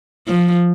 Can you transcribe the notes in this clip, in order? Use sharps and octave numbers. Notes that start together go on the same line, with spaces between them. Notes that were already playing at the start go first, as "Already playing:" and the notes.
F3